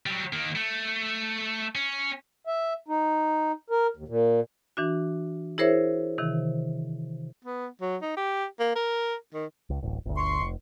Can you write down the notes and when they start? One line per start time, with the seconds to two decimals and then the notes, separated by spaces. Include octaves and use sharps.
0.06 F#3 G3
0.33 D#3 A#3
0.55 A3
1.75 C#4
2.47 E5
2.88 D#4
3.70 A#4
3.97 D#2
4.08 A#2
4.77 E3 D4 F#4
5.58 E4 G#4 A#4 C5 C#5 E5
6.18 C3 D#3 E3
7.44 B3
7.81 F#3
8.02 D#4
8.17 G4
8.59 A#3
8.76 A#4
9.34 D#3
9.70 C#2
9.83 D1 A1
10.06 G1 D2
10.17 C6 C#6
10.40 F1